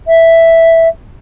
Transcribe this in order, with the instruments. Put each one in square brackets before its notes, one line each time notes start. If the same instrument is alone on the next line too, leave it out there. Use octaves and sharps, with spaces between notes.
[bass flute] E5